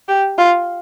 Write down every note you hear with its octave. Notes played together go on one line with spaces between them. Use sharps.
G4
F4